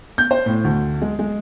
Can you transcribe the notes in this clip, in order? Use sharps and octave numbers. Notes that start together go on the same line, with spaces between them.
G6
C5
A2
D2
G#3
G#3